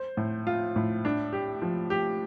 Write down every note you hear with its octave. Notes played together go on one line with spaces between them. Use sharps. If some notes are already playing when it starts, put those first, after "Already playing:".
Already playing: C5
A2
F4
A2
D4
G4
F3
G4